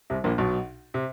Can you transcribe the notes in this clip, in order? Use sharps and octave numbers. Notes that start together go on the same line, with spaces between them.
C2 C3
A#1 A#2
B1 B2
C3